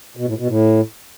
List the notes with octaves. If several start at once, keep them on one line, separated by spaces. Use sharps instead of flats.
B2
A2
B2
A2